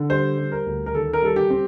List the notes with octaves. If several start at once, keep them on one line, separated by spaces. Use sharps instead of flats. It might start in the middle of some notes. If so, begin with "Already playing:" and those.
Already playing: D3
G3 C5
G3
A#4
D2
A#4
D#3 A4
A#4
G3 A4
G4
C4